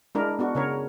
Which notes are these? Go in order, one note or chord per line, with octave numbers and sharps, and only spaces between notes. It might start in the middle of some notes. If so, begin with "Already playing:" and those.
G#3 D4 E4 A#4
B3 D4 F#4
C#3 A#4 C#5